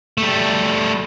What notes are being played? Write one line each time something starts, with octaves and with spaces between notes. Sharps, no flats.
G3 A3